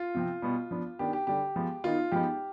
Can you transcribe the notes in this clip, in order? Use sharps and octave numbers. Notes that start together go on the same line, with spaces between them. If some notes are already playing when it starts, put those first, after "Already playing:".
Already playing: F4
C3 F3 C4
B2 G3 B3
F3 B3 D4
D#3 B3 D4 G4
G4
D3 G3 D4 G4
F3 G#3 B3
D#3 B3 D#4 F4
F3 G#3 B3 D#4 G4